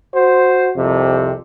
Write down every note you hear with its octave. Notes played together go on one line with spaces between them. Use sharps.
F#4 C5
C2 F2 C3